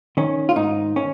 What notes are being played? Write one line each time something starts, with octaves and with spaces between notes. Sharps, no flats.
D#3 C#4
F4
G#2 D#4
C#4